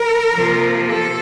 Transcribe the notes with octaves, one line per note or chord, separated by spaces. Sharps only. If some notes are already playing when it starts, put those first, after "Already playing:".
Already playing: A#4
C3 F3 A#3
A4